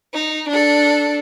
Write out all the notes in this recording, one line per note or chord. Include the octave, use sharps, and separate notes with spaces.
D#4
D4 A4